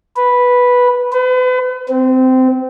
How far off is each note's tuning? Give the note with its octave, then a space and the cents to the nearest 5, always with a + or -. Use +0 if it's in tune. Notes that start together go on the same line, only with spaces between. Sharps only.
B4 -5
B4 +40
C4 -20